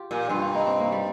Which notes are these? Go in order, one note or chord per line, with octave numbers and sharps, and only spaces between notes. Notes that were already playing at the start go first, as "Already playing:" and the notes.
Already playing: F4 G4
A#2
G2 F4
F4
D#4
C4
A#3
G3